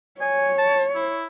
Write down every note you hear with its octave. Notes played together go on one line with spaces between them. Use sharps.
C#5 G#5
A5
E4